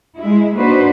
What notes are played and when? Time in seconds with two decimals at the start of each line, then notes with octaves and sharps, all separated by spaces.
0.20 G#3 E4
0.56 A#3 D4 D#4 F#4 B4 C5